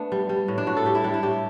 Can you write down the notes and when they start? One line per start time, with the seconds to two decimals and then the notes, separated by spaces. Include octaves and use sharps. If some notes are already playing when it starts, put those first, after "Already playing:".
Already playing: A3 B3 D4
0.12 G3
0.29 G3
0.48 A2
0.58 D4
0.67 A2 F#4
0.77 A4
0.85 G3 G4
0.95 E4
1.04 G3 D4
1.14 E4
1.23 A2 G4